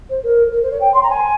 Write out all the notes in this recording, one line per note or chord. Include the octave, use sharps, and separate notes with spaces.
C5
A#4
A#4
C5
C#5
G5
C6
A#5
G#5